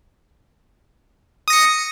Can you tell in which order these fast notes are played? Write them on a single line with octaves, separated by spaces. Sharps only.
D#6 A#6 C#7